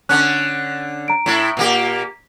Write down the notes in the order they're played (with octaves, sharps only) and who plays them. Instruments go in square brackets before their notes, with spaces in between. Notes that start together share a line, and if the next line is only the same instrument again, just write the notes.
[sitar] D3 C#4 [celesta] F#6
[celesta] A#5 D7
[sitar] A2 E4
A#2 A#3 G4